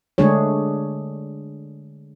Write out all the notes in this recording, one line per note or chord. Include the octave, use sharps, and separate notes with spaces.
D3 G#3 A3 D4 G#4 C#5